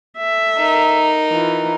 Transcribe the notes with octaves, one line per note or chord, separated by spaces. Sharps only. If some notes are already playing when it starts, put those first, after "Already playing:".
A4 E5
D#4 A#4
E3 F4